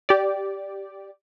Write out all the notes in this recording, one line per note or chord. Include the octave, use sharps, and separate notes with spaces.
G4 D5